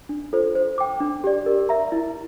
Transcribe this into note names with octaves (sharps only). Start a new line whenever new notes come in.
D4
F4 A4 C5
C5
G5 D6
D4
G4 D5
A#4
E5 A#5
E4